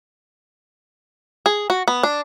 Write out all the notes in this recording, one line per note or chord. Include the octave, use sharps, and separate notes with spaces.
G#4
F#4
B3
D4